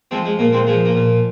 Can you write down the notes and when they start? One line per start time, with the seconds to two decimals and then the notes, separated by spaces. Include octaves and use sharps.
0.11 F3 G#3 C4
0.25 G#3
0.39 A#2 A#3
0.53 G#3 C4
0.67 F3 G#3
0.85 A#3
0.95 A#2